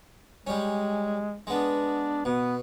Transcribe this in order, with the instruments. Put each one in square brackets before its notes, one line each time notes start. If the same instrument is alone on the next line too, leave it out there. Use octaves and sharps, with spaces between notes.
[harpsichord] G3 C#4 [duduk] G#3
[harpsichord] G#3 B3 [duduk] D4
[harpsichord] B2 [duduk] B3